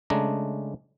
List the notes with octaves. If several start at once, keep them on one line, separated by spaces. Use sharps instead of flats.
C#3 G#3 A3 D4 A#5